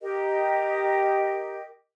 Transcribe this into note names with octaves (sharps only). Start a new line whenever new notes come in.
G4 A#4 D#5